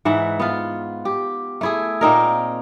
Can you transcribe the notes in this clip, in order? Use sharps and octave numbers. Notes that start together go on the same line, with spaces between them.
G#2 E3 E5 F#5
B3 F4
G4
A3 E4 G#4
A#2 C4 D#4 A#4